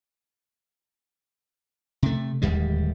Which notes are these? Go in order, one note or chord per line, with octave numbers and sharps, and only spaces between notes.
C3 A3
D1 D#2 G3 G#3